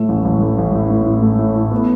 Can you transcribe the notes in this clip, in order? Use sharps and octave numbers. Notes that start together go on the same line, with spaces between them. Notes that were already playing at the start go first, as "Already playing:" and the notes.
Already playing: A2 A3
A1
A1
A2
A1
A2
A2
A2
A3
A2
A2
B3